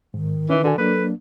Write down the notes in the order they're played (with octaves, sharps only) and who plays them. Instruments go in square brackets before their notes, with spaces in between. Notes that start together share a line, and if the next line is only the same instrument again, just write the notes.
[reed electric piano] G#2 [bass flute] D#3
[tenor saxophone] E3 [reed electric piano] C#4 D#4 [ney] B4
[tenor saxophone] D3 [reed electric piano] D4 F#4 G#5
[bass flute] F#3 [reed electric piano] A#3 D4 [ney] A4 [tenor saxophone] B4